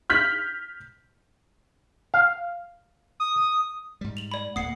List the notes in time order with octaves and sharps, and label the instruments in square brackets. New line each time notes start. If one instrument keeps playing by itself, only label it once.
[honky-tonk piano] F6 G6 B6 F#7
[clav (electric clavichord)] F5
[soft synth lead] D#6
[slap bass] G#2 G3
[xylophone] F7 F#7
D5 B5
[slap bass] D1 A#3 [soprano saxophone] F#5 [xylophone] D#6 C7